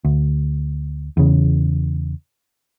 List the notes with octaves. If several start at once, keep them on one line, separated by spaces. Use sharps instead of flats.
D2
E2 C#3